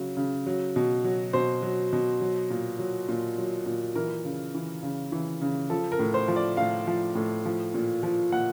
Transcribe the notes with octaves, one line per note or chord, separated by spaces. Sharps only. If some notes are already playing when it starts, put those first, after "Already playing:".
Already playing: C#3 F#3
C#3
F#3
B2
F#3
B2 C5
F#3
B2
F#3
A#2
F#3
A#2
F#3
A#2
E3 A#4
C#3
E3
C#3
E3
C#3
F3 A4
A#4
A2
C5
F3
D5
A2 F5
F3
A2
F3
A#2
F3
A#2 F#5